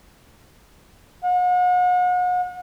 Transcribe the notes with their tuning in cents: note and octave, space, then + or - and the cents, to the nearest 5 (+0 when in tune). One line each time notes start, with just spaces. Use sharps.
F#5 -40